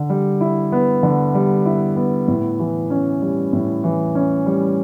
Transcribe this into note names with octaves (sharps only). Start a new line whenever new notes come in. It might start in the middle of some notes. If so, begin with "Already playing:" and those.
Already playing: D3
G3
E4
B3
D3
G3
E4
B3
A2
E3
C#4
G3
A2
E3
C#4
G3